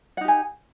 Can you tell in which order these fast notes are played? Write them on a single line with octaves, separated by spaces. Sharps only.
F#5 D#4 G4 G#5